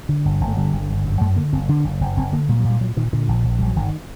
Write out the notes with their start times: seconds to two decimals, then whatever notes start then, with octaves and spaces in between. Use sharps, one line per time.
0.09 D3
0.25 G1
0.41 G1
0.48 A3
0.57 D3 G3
0.73 G1
0.89 G1
1.05 F#2
1.21 F#2 A3
1.37 D3 A#3
1.53 F#1 C4
1.69 D3 D4
1.84 F#1
2.01 F#1
2.17 F#1 C4
2.33 D3 A#3
2.49 A#2 G3
2.59 F#3
2.64 A#2
2.70 G3
2.81 A#2 F#3
2.97 A#2 D#3
3.13 A#2 D3
3.28 A#1
3.44 A#1
3.59 A#1 G3
3.68 F#3
3.76 G1 D#3